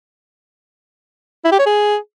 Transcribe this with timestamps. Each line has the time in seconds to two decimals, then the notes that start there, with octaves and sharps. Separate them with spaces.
1.44 E4
1.52 G4
1.59 C#5
1.66 G#4